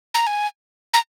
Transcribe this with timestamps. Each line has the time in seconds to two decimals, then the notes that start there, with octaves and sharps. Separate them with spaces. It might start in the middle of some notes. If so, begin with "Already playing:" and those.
0.14 A#5
0.27 G#5
0.94 A#5